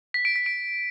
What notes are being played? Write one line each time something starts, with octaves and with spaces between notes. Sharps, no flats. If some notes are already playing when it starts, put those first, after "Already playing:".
B6
D7
B6
D7